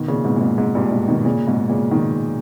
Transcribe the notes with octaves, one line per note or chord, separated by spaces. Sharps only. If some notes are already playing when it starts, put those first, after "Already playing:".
Already playing: B2 D#3
A#2 C#3
G#2 B2
A#2
G#2
G#2
G2 A#2
G#2 B2
B2 D#3
A#2 C#3
G#2 B2
A#2 C#3
B2 D#3